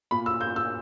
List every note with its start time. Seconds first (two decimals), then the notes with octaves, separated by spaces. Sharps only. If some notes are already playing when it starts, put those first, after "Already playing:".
0.11 A#2 B5
0.26 E6
0.41 G6
0.56 E6